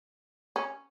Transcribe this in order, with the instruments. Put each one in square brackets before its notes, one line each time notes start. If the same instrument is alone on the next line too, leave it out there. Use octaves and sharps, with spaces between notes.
[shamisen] C#4